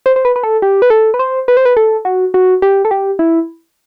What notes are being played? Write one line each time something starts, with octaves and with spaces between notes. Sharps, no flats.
C5
C5
B4
B4
A4
G4
B4
A4
B4
C5
B4
C5
B4
A4
F#4
F#4
G4
A4
G4
E4